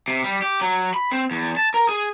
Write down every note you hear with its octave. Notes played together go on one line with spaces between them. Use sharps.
C3
G3
G4
F#3
B5
C4
E2
A5
A#4
G#4